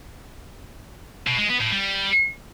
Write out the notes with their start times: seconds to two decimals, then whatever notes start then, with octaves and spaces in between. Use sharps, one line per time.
1.27 B2
1.38 G#3
1.50 B3
1.61 A2
1.72 G3